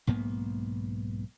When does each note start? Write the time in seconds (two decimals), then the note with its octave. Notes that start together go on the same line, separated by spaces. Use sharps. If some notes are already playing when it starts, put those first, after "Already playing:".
0.07 B1 G#2 A#3 B3